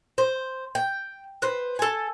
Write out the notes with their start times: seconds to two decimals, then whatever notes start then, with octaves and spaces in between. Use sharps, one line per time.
0.18 C5
0.75 G5
1.42 B4 C5
1.79 A4 G#5